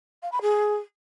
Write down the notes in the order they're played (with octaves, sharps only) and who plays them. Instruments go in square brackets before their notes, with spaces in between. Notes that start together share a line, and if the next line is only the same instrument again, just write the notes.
[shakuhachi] F5
B5
G#4